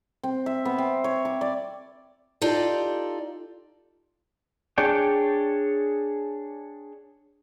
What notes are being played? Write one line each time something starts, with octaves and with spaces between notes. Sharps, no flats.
C4
E5
B3
C4
C#5
D6
D5
D#4 F4 G4 A4 D5 F5
D4 G#4 C#5 D5 G5